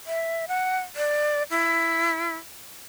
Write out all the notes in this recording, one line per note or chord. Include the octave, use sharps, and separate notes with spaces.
E5
F#5
D5
E4